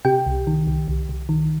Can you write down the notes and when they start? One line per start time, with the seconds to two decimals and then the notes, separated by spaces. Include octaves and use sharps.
0.05 C3 G4 G5
0.26 C2
0.47 D#3
0.67 C2
0.88 C2
1.09 C2
1.29 D#3